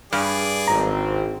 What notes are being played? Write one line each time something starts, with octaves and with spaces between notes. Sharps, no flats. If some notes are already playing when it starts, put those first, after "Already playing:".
G2 G#4 D5
G#1 C4 A#5